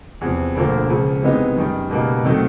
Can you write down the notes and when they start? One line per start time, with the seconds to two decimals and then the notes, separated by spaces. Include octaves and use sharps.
0.21 E2 C3 F3
0.55 E1 D2 D3 F3 A#3
0.88 C#2 C#3 F3
1.22 C3 E3 G#3 B3 D#4
1.56 F#2 D#3 G3
1.89 C#2 B2 G3 A#3 D#4
2.24 C3 D#3 F#3 A3